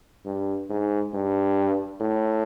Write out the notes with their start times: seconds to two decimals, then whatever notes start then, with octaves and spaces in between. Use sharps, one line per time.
0.25 G2
0.70 G#2
1.14 G2
2.01 A2